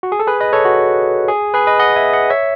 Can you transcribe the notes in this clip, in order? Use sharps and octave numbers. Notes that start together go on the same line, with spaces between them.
F#4
G#4
A4
G#4 B4
B4 D#5
A4 C#5
F#4
G#4
G#4 B4
B4 D#5
D#5 F#5
E5 G#5
D#5 F#5
C#5 E5